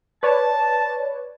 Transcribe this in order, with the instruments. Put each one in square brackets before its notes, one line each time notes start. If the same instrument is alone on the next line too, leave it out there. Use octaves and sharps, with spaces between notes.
[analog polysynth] B4 C#5 D5 [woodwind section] A5